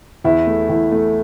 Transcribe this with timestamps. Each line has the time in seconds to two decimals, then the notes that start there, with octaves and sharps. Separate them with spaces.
0.25 E2 E4
0.47 A3
0.69 E2
0.92 A3